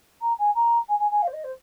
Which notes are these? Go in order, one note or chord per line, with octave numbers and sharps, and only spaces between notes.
A#5
G#5
A#5
G#5
G#5
G#5
F5
C5
D#5
C5